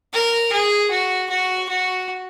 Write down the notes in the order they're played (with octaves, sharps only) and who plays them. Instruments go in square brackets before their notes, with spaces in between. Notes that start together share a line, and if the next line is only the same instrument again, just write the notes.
[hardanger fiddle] A#4
G#4
F#4
F#4
F#4